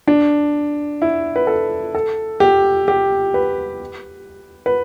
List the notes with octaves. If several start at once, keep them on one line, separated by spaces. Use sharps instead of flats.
D4
E4
B4
A4
A4
G4
G4
B4
B4